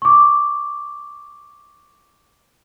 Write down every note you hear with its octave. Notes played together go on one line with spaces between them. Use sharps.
C#6 D6